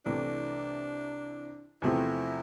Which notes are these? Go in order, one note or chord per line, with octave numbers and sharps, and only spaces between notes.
C2 C3 E3 A3 D4
E2 C3 F3 A3 C4 E4